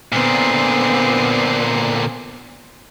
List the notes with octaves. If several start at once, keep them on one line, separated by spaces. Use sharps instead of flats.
A#2 D3 B3 C4